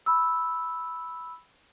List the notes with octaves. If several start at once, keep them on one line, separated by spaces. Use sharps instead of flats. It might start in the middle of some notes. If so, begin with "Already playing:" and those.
B5 E6